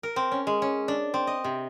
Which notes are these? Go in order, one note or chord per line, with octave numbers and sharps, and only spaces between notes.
A#4
C4
C#4
G#3
C#4
D4
C4
D#5
C3